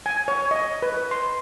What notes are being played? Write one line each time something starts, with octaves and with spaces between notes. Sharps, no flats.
G#5
C#5
D#5
B4
C6